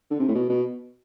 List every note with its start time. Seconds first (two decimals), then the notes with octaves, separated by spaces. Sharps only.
0.11 D3
0.20 C3
0.28 A2
0.35 B2
0.49 B2